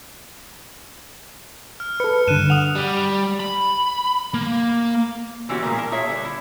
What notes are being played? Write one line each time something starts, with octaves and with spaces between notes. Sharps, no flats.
F6
A4 B4 C#7
G2 D3 F#6 D#7 E7
F#5 D#6 F7
G3
B5
A#3
D3 E3 B3 C#4 F#4 G4
A#2 D3 G#3 A#3
A#4 A5
F4 G#4 C#5 E5
D3 G3
E4